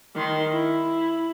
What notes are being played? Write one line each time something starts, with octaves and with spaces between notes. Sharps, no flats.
D#3 C6
E4